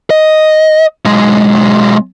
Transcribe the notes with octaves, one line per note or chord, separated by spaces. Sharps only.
D#5
B1 G#3